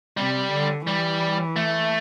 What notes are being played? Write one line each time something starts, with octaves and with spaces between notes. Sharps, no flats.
C3 G3
D3
E3 G3
A3